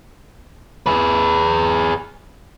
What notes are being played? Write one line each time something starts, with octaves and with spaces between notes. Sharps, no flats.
G#4 B4